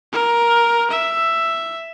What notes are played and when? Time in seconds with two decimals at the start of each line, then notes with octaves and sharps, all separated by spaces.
0.13 A#4
0.91 E5